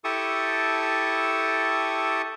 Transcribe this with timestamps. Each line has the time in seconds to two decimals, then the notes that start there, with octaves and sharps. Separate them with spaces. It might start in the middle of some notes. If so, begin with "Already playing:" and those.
0.04 E4 G4 A4 A5 C#6 D#6